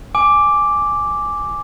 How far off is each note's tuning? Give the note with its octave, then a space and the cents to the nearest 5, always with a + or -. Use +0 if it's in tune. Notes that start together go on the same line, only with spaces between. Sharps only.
G#5 +0 D6 -5